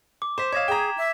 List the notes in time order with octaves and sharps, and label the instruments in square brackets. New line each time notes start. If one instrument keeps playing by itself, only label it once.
[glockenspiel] D6
[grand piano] C5 [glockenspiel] B6 E7
[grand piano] C#5 D#5 F5 [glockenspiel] G#6 E7
[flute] G#4 [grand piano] G5 A#5
[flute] E5